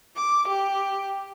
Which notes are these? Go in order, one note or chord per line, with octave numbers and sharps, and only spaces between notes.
D6
G4